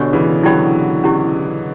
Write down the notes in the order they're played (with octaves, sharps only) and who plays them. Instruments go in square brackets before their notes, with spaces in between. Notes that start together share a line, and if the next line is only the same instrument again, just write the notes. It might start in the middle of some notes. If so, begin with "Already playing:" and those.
Already playing: [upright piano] B2 D3 [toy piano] D4 G4 C#5
[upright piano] C#3 E3
[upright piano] D3 F#3 [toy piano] E4 G4 D5 G5 B5
[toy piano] C#4 E4 G4